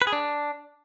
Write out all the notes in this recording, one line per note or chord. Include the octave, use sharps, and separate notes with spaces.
B4
G#4
D4